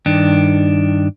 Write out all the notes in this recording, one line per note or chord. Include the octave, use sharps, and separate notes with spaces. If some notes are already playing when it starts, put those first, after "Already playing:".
G2 D#3 D4